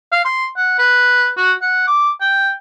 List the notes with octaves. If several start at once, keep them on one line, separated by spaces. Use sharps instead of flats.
F5
C6
F#5
B4
F#4
F#5
D6
G5